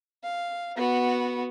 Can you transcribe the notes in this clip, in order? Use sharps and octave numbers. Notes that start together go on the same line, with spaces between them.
F5
B3 F#4